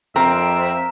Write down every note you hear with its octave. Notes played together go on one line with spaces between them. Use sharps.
F2 C4 A#4 E5